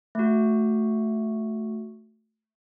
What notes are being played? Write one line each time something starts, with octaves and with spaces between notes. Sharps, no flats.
A3 F#4